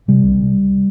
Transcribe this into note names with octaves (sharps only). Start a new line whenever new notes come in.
C3 G3
C2